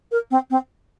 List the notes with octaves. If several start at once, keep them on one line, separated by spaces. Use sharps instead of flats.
A#4
C4
C4